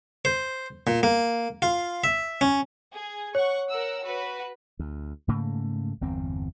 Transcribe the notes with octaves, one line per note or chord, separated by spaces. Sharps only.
C5
A#2
A#3
F4
E5
C#4
G#4
C#5 F#5 C#6
A#4 F#5 E6
F#4 B4
D2
G#2 C#3 A3 A#3
G1 E2 C4